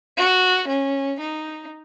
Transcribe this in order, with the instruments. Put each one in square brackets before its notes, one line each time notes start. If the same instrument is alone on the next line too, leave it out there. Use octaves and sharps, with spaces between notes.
[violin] F#4
C#4
D#4